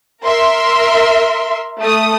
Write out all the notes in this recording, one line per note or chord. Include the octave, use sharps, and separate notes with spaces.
A#4 E5 C6
A3 D#6